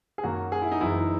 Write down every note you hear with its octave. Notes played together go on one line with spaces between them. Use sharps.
G#4
F#2 D#3 F#3 A#3 F#4
G#4
E4
D#4
F#1 F#2 E3 G#3 E4
D#4